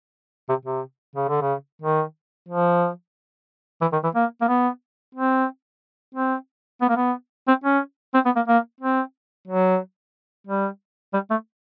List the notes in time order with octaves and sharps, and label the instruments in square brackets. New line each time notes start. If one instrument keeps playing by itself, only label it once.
[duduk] C3
C3
C#3
D3
C#3
D#3
F3
E3
D#3
E3
A#3
A#3
B3
C4
C4
B3
A#3
B3
C4
C#4
C4
B3
A#3
A#3
C4
F#3
G3
G3
A3